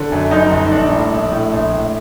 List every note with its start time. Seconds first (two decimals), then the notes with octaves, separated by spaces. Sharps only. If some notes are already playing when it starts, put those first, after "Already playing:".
Already playing: D3
0.12 F#2
0.31 G1 D#4
0.51 G1
0.71 A#1 D4
0.91 A2
1.12 A#1
1.32 A2
1.52 A#1
1.72 A2